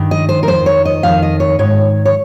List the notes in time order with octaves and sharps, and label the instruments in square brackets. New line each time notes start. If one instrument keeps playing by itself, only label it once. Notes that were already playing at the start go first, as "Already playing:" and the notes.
Already playing: [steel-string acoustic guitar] G2 D#3
D#5
C5
A#4
F2 D#3 C5
C#5
D#5
F2 D#3 F5
D#5
C#5
G#2 D#3 C#5
C#5